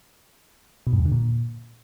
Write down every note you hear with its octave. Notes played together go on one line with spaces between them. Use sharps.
B2
G2
E2
D3
A#2